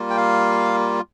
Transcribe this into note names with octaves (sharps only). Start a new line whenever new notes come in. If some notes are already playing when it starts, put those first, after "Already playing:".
Already playing: G3 A#3 F4
G5
F5